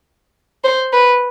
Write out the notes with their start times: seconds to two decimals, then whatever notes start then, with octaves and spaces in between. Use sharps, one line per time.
0.64 C5
0.93 B4